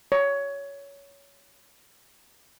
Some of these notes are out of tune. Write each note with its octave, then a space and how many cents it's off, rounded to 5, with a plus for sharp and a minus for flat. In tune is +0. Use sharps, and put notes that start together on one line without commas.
C#5 +15